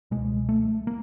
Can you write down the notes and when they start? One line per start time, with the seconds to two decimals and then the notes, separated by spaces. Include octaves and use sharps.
0.11 C#2 B2 G#3
0.49 A3
0.87 A#3